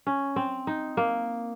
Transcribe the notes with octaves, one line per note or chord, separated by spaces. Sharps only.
C#4
C4
D#4
A#3